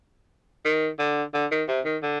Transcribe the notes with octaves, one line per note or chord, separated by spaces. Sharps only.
D#3
D3
D3
D#3
C3
D#3
D3